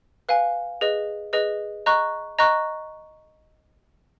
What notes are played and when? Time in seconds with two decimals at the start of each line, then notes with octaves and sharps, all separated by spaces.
0.29 B4 F5 G#5
0.81 G#4 B4 D#5
1.33 G#4 B4 D#5
1.86 D#5 A#5 C#6 F#6
2.39 D#5 A#5 C#6 F#6